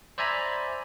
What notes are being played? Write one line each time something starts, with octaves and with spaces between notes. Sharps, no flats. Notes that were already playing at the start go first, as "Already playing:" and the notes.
C5 D5 E5 G#5 A#5 B5